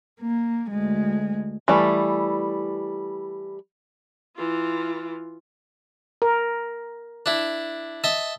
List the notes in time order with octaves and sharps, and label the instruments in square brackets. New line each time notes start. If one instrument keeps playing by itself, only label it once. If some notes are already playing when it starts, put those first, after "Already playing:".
[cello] A#3
D2 G#3
[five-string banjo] E3 G3 A3
[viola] E3 F4
[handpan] A#4
[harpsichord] D4 E4
D#5 E5 A5